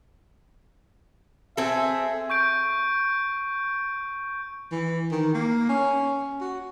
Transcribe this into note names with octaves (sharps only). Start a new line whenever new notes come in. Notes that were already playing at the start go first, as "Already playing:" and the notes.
C4 G#4 A4 E5
C#6 G6 D7
E3
D#3
A#3
C#4
F#4